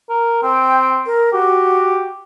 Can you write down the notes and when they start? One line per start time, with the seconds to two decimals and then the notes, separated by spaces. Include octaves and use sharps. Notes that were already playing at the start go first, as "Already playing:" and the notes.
0.09 A#4
0.43 C4 G5
1.06 A#4
1.33 F#4 G4